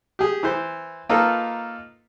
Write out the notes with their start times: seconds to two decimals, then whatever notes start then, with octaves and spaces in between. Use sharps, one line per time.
0.19 G4 G#4
0.43 E3 C5
1.09 A#3 D#4 F4 A4 B4